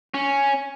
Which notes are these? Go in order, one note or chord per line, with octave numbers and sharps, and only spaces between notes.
C#4